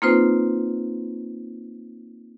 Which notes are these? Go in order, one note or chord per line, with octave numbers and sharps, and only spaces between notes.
A#3 C4 D#4 F4 B4 C5